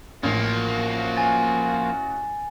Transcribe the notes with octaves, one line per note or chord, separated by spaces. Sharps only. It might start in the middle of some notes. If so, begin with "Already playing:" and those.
A1 F3 A#3 F#4
G#5 A6